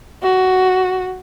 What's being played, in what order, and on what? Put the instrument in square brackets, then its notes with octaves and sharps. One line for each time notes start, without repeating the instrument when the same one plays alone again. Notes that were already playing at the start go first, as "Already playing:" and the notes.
[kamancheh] F#4